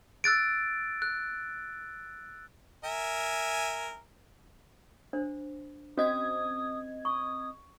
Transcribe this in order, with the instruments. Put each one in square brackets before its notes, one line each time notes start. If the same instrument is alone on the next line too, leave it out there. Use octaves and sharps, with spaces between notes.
[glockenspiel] E6 F#6 A6 D7
F#6
[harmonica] A#4 E5 G#5
[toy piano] D4 C5
[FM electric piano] C4 D#5 G#6 [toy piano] C#4 F#4 [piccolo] D#6
[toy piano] C#6 [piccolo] D#6